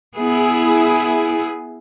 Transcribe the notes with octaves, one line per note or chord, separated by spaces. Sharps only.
B3 E4 G#4